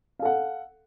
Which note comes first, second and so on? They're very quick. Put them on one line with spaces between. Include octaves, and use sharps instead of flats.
F5 A4 F#5